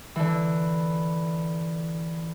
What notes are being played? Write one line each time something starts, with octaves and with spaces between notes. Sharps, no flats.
D3 E3